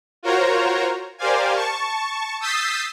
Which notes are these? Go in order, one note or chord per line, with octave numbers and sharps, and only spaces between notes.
F4 F#4 A#4 C5 C#5 A#5
G4 A#4 C5 D5 F5 G#5
A5 C#6
D#6 E6 G6 A6 B6 C7